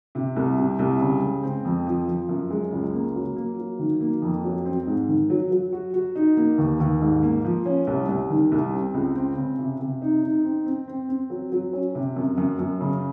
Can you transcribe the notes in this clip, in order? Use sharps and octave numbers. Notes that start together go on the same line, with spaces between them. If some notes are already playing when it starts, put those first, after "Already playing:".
C3
C2
C3
C2
C#3
G#3
C4
F2
F3
F3
F#2
G#3
C#2
A#3
F#3
A#3
F#3
D#3
A#3
F2
F#3
C4
G#2
D#3
F#3
F#3
F#4
F#4
D#4
A#3
D#2
D#2
G#2
A#3
F3
C#4
C2
C2
D#3
C2
C4
C#2
C4
C#3
C3
C3
D#4
D#4
C4
C4
C4
C4
F#3
F#3
C#4
C3
F#2
F#2
F#2
C#3